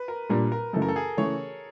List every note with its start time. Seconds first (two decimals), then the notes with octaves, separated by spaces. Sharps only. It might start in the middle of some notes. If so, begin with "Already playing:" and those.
Already playing: B4
0.08 A#4
0.29 A#2 G3 A#3 D4 A#4
0.52 A#4
0.73 F#2 C#3 E3 A3 A4
0.82 A#4
0.88 A4
0.96 G#4
1.17 C#3 E3 A3 C#5